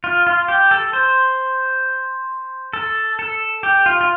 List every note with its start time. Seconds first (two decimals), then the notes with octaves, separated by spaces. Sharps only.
0.04 F4
0.27 F4
0.48 G4
0.71 A4
0.93 C5
2.73 A4
3.19 A4
3.63 G4
3.86 F4
4.01 F4